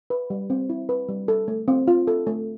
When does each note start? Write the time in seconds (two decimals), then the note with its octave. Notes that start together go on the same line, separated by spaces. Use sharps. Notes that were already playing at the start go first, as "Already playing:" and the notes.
0.10 B4
0.30 G3
0.50 C4
0.69 E4
0.89 B4
1.09 G3
1.28 A4
1.48 A3
1.68 C4
1.88 F4
2.07 A4
2.27 A3